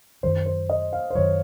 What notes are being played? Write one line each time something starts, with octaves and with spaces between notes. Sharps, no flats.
F#2 D#3 F#3 C5
C5
D#5
F5
C5
F#2 D#3 F#3 C#5